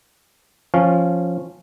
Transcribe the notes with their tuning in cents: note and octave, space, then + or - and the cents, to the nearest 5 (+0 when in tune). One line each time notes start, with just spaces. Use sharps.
F3 +0 C#4 -15 F5 +0